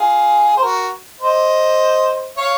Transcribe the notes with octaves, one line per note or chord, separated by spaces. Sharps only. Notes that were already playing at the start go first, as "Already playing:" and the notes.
Already playing: F4 G#4
C5
F#4 A#4
C5 D#5
C#5 F5